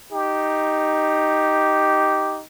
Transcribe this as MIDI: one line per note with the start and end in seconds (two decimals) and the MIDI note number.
0.12 2.44 63
0.12 2.40 67